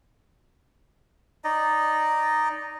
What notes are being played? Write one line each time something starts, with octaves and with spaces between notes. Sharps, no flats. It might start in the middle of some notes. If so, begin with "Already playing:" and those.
D#4 D5 D#5